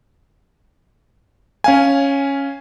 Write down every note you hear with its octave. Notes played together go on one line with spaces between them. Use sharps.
C#4 F5 G#5